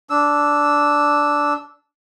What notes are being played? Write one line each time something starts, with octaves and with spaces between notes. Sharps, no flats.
D4 E6